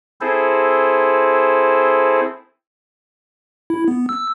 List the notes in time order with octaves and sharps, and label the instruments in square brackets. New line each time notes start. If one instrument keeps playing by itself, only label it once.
[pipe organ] C4 E4 G#4 A4 C5
[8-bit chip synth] E4
B3
E6